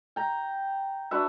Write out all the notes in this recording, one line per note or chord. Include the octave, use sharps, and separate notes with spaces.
G5 A#5
D4 F#4 B4 E5